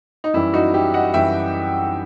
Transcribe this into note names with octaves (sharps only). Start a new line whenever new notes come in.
D#4
F#2 E3 G3 E4
D#4 F#4
E4 G4
D#5 F#5
F#2 E3 G3 E5 G5